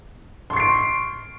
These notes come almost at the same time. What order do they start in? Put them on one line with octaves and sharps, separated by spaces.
C6 C#6 C7 D7